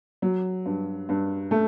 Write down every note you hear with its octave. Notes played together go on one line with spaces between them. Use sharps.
F#3
G2
G2
A3